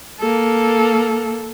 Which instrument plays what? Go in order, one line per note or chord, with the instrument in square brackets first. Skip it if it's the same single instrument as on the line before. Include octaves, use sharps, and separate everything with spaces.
[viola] A#3 A4